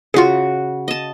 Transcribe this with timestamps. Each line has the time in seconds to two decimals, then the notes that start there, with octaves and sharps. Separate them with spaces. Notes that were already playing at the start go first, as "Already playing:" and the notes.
0.14 C#3 F4 F#4 G#4
0.88 D#5 A5